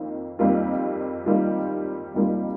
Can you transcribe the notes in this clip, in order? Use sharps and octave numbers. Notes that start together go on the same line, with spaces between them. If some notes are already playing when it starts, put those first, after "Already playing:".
Already playing: F2 D#3 A#3 F4
F2 D#3 G3 A#3 F4
F2 D#3 G3 A#3 F4
F2 D#3 G3 A#3 F4